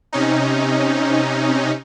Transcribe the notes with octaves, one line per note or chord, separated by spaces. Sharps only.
C3 C#4 D#4